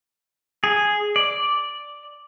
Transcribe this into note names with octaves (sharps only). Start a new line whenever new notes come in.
G#4
D5